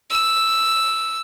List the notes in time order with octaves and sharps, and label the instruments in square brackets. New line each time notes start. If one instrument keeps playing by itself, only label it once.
[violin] E6